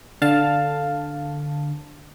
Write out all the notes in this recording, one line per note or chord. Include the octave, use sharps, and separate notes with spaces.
D3 F5 A5